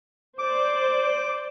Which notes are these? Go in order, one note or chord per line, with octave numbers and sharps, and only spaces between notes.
C5 D5 D6